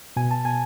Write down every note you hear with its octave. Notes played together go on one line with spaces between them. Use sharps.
B2 G#5
A5
B2 G#5